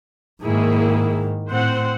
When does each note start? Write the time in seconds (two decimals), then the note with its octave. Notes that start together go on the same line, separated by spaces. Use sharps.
0.42 G#2 D#3 A#3 E4 G#4
1.50 A2 C4 C5 F#5